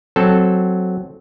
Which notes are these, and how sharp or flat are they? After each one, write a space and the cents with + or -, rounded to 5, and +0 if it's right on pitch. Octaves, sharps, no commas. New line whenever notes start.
F#3 +0 C4 +0 A4 -5